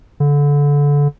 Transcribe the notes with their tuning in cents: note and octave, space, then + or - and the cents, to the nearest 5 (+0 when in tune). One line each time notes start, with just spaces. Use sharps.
D3 -25